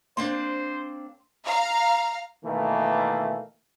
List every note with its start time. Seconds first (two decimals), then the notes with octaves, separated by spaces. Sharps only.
0.17 A#3 C4 D4 C5 C6
1.45 F5 A#5
2.45 B2 D#3 E3 A3 A#3